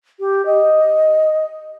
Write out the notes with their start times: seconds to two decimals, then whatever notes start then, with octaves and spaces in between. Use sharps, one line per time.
0.20 G4
0.46 D#5